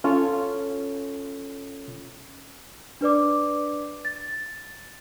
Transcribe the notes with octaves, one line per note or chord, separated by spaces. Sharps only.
C#4 F4 A4 C#5
D4 B4 D5 D6
A6